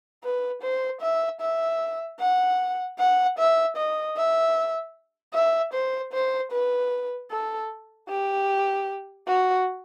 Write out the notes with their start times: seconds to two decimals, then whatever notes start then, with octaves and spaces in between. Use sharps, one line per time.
0.23 B4
0.62 C5
1.01 E5
1.41 E5
2.20 F#5
2.99 F#5
3.38 E5
3.76 D#5
4.17 E5
5.34 E5
5.73 C5
6.13 C5
6.52 B4
7.31 A4
8.09 G4
9.27 F#4